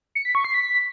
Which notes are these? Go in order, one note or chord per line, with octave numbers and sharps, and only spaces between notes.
C#7
B6
C#6
C7
B6